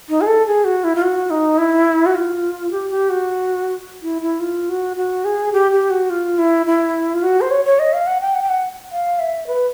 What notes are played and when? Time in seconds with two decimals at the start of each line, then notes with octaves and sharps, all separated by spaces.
0.09 D#4
0.21 G#4
0.27 A4
0.47 G#4
0.65 F#4
0.84 E4
0.96 F4
1.02 F#4
1.30 D#4
1.58 E4
2.06 F#4
2.15 F4
2.71 G4
2.90 G4
3.10 F#4
4.03 E4
4.22 E4
4.40 F4
4.69 F#4
4.97 F#4
5.25 G#4
5.53 G4
5.72 G4
5.90 F#4
6.10 F4
6.38 E4
6.66 E4
7.15 F4
7.23 F#4
7.41 C5
7.50 C#5
7.65 C#5
7.79 D#5
7.93 F5
8.07 F#5
8.21 G5
8.34 F#5
8.42 G5
8.49 F#5
8.92 F5
9.19 E5
9.47 B4